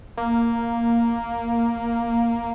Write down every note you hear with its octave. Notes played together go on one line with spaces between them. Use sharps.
A#3